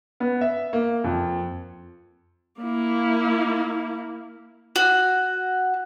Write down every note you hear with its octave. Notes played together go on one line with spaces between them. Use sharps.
B3
E5
A#3
F2
A#3 E4
F#4